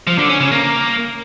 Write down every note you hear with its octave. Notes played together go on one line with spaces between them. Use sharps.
F3
D3
C#4
C#3
A#3